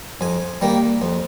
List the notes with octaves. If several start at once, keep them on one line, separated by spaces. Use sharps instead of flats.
F2 G#5
D#3 G3 A#3
F2